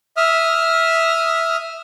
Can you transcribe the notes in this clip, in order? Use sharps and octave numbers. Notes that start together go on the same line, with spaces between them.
E5 D#6 F6